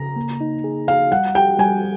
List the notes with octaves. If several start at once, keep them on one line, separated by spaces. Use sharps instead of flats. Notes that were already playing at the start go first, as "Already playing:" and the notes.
Already playing: C#3 A#5
A#3
D#4
G#4
G#4 F5
G3 F#5
G4 G5
G3 G#5